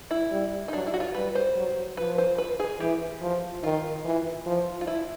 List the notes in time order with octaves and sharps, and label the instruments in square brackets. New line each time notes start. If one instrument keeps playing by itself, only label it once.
[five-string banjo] E4
[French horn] G3
[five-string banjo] D#4
[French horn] F#3 [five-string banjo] D4
[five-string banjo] E4
F#4
F4
[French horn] G3 [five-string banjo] B4
[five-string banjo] C5
[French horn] F#3
[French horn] F3 [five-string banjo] B4
[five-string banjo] C5
B4
G#4
[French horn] E3 [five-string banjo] G4
[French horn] F3
[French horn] D#3 [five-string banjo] F4
[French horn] E3
F3
[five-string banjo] F4
E4